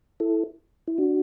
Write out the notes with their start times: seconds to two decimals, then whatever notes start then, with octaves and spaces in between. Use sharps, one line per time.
0.20 E4 A4
0.88 E4
0.98 D4 F#4